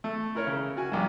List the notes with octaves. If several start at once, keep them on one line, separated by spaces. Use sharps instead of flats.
A3
E4 A#4 C#5
C#3
F#4 G#5
A#1 G2